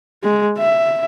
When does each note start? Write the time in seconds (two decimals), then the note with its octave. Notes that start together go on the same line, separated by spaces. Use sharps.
0.23 G#3
0.58 E5